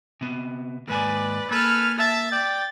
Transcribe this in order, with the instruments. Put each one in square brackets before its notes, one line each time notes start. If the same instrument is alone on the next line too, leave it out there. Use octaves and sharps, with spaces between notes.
[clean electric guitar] C3 B3
[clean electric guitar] D#2 G#2 G#5 [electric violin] B4 D5
[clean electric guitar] A#3 [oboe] A4 [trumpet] B4 [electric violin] G#5 F6
[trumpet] E5 [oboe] A5 [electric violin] A6
[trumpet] D5 [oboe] G5